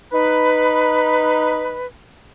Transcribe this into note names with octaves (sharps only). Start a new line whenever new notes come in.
D#4 B4